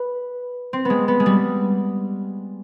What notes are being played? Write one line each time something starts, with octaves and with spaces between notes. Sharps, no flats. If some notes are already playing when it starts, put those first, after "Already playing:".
Already playing: B4
C4
G#3 B3
B3
G#3
G3